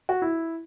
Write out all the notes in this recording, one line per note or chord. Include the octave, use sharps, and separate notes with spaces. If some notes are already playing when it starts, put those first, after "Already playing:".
F#4
E4